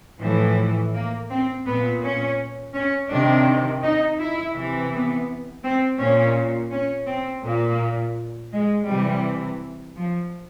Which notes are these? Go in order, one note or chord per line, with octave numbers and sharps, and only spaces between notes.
A2 E3 F3
A#3
C4
A#2 B3
C#4
C#4
C3 D#3 D4
D#4
E4
C3 E3
B3
C4
A#2 C#4
C#4
C4
A#2 A#3
G#3
C3 E3 G3
F3